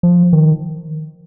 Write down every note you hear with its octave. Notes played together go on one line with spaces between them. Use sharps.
F3
D#3